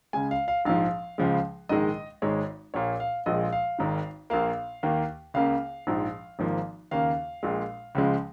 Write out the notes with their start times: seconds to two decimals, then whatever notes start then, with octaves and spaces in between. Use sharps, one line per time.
0.13 C#2 C#3 G#3 G#5
0.31 F5
0.48 F5
0.65 A#1 G#2 F3 F5
1.18 C#2 C#3 F3 G#3
1.69 A#1 G#2 D#3 G#3 D#5
2.22 G#1 G#2 G#3 C#5
2.74 A#1 A#2 A#3 C#5
3.00 F5
3.26 A#1 A#2 F3 G#3 D#5
3.52 F5
3.79 G#1 G#2 D#3
4.30 A#1 A#2 A#3 F5
4.83 D#2 D#3 A#3
5.34 C#2 C#3 A#3 F5
5.87 A#1 G#2 F3
6.39 G#1 G#2 F3 A#3
6.91 D#2 C#3 A#3 F5
7.43 A#1 A#2 G#3
7.95 C#2 C#3 F3 G#3